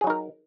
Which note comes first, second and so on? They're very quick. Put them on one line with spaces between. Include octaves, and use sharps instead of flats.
G#4 F#3 D#4 A#4